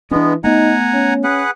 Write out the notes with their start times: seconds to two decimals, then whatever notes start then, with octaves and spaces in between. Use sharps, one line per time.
0.11 E3 G#3 B3 C#4 D4
0.44 A3 B3 D#4 F#5 G#5 A#5
0.94 C#4
1.24 G#4 B4 F#5